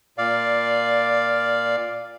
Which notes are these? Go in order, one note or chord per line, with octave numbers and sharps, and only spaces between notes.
A#2 D5 F5